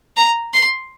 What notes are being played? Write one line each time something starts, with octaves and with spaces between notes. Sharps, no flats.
A#5
C6